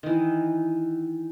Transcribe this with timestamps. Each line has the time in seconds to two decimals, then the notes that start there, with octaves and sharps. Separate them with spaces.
0.03 D#3 E3